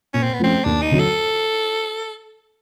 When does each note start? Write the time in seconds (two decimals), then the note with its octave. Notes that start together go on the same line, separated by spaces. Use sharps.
0.14 A#2 C#4
0.23 C4
0.34 B3
0.39 F3 A3 C4 C#4
0.65 D#2 D4
0.82 D#4
0.91 D3 F#3
0.99 A4